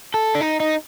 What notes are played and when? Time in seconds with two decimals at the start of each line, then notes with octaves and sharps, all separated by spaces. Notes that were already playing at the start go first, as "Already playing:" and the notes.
0.14 A4
0.35 D4
0.41 D#4
0.60 D#4